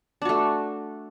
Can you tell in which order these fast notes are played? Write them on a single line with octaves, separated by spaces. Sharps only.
D4 F#4 A3